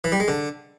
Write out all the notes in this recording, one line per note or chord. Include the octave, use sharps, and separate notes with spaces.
E3
G3
G#3
D3